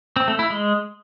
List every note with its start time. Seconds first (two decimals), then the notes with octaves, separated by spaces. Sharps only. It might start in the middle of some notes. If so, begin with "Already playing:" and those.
0.16 C4
0.28 A3
0.39 E4
0.50 G#3